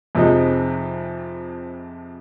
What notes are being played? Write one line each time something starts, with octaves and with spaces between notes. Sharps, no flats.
F2 C3 F3 G#3 D#4